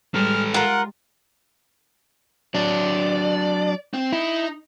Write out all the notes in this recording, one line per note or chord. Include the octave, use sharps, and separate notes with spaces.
G3 G#3 A4 B4 F6
F4 A#4 F#5
F#3 D4 D5
C4
D#4 E4